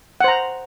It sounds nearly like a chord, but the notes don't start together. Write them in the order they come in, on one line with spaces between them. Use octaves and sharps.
F#5 C5 A#5